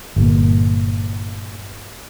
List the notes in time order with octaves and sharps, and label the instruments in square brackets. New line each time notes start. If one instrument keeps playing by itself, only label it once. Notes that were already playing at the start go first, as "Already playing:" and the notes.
[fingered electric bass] G1 A#2